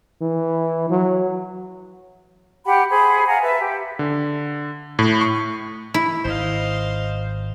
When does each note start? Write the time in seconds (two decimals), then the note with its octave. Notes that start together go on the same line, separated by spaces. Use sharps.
0.22 E3
0.90 F#3
2.66 G4 F#5 G5 B5
2.89 G#4 C5 B5
3.27 F5 F#5 G#5 A#5
3.41 B4 E5 A5
3.59 G4
3.99 D3
4.99 A2
5.21 C#6
5.94 E4
6.25 G#1 C5 D#5 F5